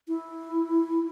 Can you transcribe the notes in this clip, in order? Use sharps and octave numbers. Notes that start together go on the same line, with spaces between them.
E4